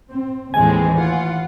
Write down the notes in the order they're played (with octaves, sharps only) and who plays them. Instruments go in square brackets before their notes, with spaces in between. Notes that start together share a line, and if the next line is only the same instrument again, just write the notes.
[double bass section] C4
[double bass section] D#2 E3 [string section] A2 G#3 C4 [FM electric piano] G#5
[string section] F4 F#5